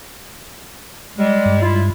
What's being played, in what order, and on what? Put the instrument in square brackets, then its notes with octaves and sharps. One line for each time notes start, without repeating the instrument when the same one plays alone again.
[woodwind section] G3 G#3
[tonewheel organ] G2
[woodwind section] E4 F4